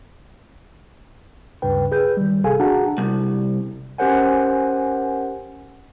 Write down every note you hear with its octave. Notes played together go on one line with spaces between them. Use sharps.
D2 G2 C#3 B4 G5
G#4 B4 G6
D#3 G3
G1 C3 G#4 A4 F5 G#5
D4 F#4 G#4 F#5 A5 A#5
C2
C#4 G4 A#4 C5 F#5 G#5